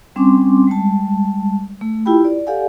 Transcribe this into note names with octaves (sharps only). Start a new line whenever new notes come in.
G3 C4 C#4 G#5 C6 D6
G3 G#3 A5
A3
E4 F4 G4 G5 B5
D5
G4 A4 D5 F5 F#5 G#5